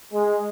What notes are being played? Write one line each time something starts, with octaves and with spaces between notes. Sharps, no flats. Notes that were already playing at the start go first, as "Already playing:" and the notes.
G#3